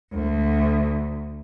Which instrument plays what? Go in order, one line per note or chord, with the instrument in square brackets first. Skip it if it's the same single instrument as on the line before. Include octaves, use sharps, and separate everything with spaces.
[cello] D2